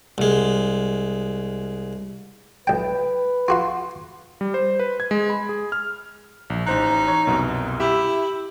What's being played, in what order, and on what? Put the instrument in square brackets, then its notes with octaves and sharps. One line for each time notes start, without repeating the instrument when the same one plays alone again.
[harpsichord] C2 G#3
[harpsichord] B1 G5 [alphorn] B4
[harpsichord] F4 F#4 C6
[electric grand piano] G3
C5
B4
G#6
G#3
B5
G#4
F6
A#1
[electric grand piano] A1 C5 F#6 [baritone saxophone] D#4
[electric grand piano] C#5
C2 F#2 B2
[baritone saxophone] E4 [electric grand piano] G4 E5